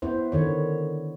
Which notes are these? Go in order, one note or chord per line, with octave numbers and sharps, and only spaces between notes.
B3 E4 B4 C5
D3 D#3 C#5